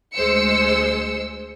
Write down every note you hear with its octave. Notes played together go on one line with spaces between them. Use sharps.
D2 G#3 C5 E6 C#7